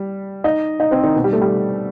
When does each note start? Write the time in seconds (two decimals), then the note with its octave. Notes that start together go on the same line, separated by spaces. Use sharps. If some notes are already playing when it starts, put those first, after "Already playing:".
Already playing: G3
0.44 D#4 D#5
0.80 D#4 D#5
0.91 C4 C5
1.04 D#3 D#4
1.15 B2 B3
1.24 G3
1.33 A3
1.41 G3